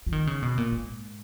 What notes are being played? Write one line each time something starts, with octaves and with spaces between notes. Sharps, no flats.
F3
D#3
C#3
B2
A#2
G#2